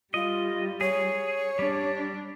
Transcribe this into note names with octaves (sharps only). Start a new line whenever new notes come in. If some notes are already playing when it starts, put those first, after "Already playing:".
G3 F4 D#5
G#4 C#5
G3 D4